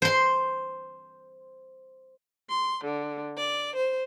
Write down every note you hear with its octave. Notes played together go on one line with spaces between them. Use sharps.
C5 C6
C6
D3
D5
C5